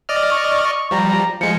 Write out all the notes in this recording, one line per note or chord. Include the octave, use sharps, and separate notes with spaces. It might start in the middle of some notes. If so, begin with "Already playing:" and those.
D5 D#5 F6
C#6
C#6
F3 G3 A#5
F3 G#3 C#7